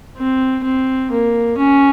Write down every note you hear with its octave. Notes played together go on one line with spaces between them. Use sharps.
C4
C4
A#3
C#4